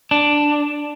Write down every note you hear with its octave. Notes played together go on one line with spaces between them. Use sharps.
D4